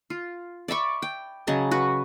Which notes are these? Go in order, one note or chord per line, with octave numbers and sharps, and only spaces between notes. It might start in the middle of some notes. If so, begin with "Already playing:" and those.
F4
D5 E5 B5 C#6
G5
C#3 F#3 D#5 A5
F#4 B4